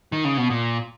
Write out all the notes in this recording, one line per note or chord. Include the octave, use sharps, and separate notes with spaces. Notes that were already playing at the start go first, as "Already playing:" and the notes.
D#3
C#3
B2
A#2